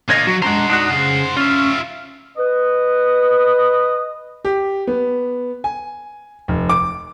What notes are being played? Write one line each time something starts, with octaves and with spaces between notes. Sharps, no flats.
D3 A#3 F4 C#5 D#5
F#3 F#4
G#3 D4 C5 F#5 A#5
D4 D#4 F#4
C#3
C#4 F4 E5
B4 D#5
G4
B3
G#5
F1
D6